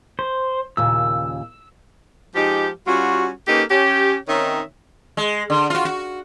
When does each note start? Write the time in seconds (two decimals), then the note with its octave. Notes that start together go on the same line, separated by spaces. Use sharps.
0.19 C5
0.77 D#2 A#2 C#3 E6
2.35 F3 G#3 D#4 G4
2.87 G3 C#4 F4 F#4
3.48 A#3 C#4 D#4 G4 A4 B4
3.71 C#4 G4
4.27 D#3 C4 C#4 D#4 C#5 E5
5.17 G#3
5.50 D3
5.70 F4 F#4
5.85 F#4